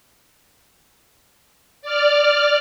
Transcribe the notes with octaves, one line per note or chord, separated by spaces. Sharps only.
D5 F6